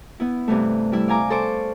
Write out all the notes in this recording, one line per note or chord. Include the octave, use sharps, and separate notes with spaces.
B3 E4
G2 C3 E3 A3
G3 E4 E6
D5 F5 G#5 A#5 D6
A4 C5 C#6 D6